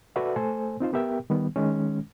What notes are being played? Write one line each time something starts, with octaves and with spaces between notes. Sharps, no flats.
F#4 A4 B4 D5 E5 F#5
A3 A4 C5 G#5
C4 D#4 F4 C5
B3 G4 A#4 E5 G5
D#3 G3 B3
D#3 G#3 C#4